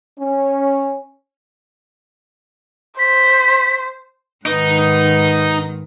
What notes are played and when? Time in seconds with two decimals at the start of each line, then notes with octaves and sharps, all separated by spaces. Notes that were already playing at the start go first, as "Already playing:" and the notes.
0.19 C#4
2.99 C5 B6
4.46 G#2 D#3 D#4 B4 F#5